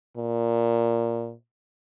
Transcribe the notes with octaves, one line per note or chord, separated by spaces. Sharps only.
A#2